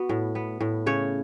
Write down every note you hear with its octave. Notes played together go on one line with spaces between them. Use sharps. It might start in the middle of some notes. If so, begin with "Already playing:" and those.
Already playing: B3 F#4
A2
B3
A2
C#3 C#5